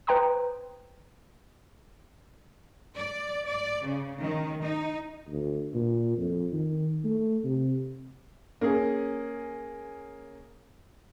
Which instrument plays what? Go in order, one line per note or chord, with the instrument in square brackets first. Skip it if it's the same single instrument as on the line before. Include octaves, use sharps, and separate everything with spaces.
[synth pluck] B4 C5 G5 A#5 C6 D#6
[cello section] D5
D5
C#3
D#3
D#4
[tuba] D2
A#2
F2
D#3
A3
C3
[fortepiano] A#3 C#4 G#4